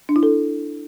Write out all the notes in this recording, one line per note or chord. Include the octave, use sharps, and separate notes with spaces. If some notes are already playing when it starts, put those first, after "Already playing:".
D4
E4
A4